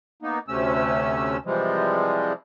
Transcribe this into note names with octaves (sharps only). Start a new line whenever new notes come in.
A#3 B3 D#4
D2 C3 A3 C#4 E6
C3 E3 F3 G3 G#3